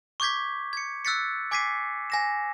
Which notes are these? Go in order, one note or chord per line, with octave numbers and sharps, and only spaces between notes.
C#6 D6 G6 G#6 B6
G#6 C#7
E6 F#6 G6 A6 B6 C#7
G#5 D6 G#6 B6 C7 D#7
G#5 A#6 E7